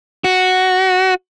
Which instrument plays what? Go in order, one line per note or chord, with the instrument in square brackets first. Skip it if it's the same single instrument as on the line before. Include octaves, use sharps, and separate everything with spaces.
[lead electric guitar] F#4